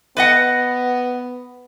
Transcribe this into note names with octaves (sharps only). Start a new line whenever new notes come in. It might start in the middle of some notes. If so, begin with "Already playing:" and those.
B3 B4 D#5 F#5